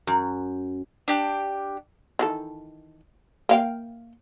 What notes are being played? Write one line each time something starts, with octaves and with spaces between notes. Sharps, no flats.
F#2
D4 G4
D#3 E3 A4
A#3 F5 G5